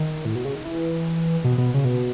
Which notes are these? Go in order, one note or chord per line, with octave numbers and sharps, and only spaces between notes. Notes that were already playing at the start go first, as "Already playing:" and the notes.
Already playing: D#3
A2
B2
C#3
D#3
E3
B2
B2
C#3
B2